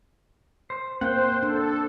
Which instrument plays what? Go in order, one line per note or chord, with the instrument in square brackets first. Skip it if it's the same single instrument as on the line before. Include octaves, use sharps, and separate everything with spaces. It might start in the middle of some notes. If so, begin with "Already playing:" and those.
[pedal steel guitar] C5
[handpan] A#3 C4 [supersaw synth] C5 [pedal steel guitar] F#5 G5
[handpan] D4 [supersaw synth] A4